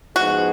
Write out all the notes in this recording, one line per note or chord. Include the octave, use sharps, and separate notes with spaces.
G#2 F3 B3 D#4 F#4 G#4